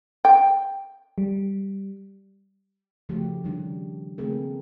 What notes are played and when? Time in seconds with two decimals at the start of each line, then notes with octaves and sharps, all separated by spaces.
0.25 G5
1.18 G3
3.09 C#3 F3 A3 F#4 G4
3.44 D#3 G3 D4
4.18 C#3 A3 A#3 C4 G#4 A#4